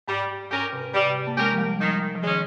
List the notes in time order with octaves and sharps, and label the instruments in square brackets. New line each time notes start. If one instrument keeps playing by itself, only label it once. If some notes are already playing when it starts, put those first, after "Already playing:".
[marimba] G#2 [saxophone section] G3
[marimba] G#2 [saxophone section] C#4 G4 A#4
[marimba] C3
[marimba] C3 [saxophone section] G3
[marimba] A#3
[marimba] G#3 [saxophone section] C#4 G4 A#4
[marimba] F3
G3
[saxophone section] D#3 [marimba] F3
[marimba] F3
[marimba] D#3 [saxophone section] G#3 C#4